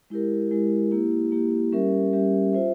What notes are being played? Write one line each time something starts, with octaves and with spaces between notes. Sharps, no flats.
G#3 E4 G4 A#4
G#3 E4 G4 A#4
A#3 E4 G4
A#3 E4 G4
G3 C#4 G4 A#4 E5
G3 C#4 G4 A#4 E5
F4 C5 E5